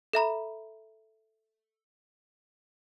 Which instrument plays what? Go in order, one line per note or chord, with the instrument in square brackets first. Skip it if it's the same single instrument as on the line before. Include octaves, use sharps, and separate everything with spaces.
[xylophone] A4 E5 A#5 B5